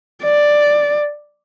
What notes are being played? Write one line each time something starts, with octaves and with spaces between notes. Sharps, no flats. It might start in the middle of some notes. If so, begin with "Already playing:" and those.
D5